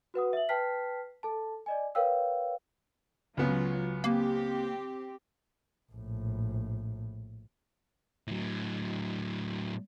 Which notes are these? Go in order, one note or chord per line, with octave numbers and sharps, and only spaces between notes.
F#4 B4 F#5 D#6
E5 F#7
B4 G5 A5 F6 B6 C7
A4 A5
D5 D#5 G#5
A#4 B4 C#5 F5 G5 E6
C#2 F#3 B3 C#4 F4
A#3 C4 G4
A#1 A2
A2 F#3